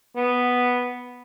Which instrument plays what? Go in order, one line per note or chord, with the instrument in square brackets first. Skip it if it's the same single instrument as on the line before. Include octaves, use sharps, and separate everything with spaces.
[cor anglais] B3